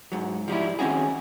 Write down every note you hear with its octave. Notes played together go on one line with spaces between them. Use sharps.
G#2 F#3
F3 G3 D#4 E4
D#3 C4 C#4 F#4 G#4